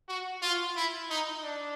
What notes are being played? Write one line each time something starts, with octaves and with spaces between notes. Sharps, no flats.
F#4
F4
E4
D#4
D4